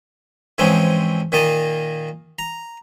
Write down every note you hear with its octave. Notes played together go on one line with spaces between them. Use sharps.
G#2 E3 F3 G#3 C4 C#4
A#2 D#3 A#3 D#5 A5
A#5